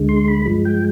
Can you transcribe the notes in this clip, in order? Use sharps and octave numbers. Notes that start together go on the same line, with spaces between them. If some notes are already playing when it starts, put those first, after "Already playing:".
Already playing: D2 D3 G#3
C6
B5
G2 F3 G#3
G5